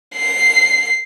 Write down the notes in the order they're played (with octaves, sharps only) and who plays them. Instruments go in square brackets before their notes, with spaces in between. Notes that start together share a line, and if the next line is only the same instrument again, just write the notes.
[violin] C7